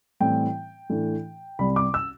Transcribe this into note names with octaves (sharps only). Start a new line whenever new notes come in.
A2 E3 G3 C4 G5
A2 E3 A3 D4
C2 C3 G3 B5
D6
E6